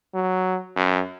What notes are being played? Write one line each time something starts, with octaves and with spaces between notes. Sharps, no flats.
F#3
F#2